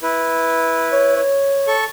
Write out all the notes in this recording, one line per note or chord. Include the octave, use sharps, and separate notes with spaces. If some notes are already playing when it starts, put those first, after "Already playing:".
E4 B4
C#5
C#5
A4 C#6